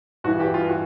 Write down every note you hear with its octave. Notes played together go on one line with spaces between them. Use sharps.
G2 E3 F#4
G4
F4
F#4